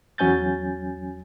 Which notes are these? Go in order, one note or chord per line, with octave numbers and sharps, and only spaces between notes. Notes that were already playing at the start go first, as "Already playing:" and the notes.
E2 F#3 C#4 G#5 G6 A6